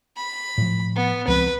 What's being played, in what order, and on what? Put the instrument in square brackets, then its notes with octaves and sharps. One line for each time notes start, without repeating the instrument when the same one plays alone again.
[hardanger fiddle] B5
[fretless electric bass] A2 F3
[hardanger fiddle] B3
[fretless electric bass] C#2 F3 C4 [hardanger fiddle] B4